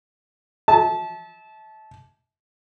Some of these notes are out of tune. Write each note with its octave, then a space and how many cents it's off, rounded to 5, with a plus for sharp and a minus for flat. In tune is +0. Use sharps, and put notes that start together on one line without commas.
E5 -35 A5 -20